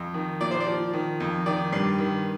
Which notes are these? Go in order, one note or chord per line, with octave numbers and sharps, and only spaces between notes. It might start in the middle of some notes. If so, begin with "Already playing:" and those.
Already playing: F2
D#3
A#2 D5
C5
D5
F3
D#3
F2
D#3 D5
G2
D#3